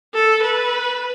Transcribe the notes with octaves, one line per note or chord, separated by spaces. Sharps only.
A4
B4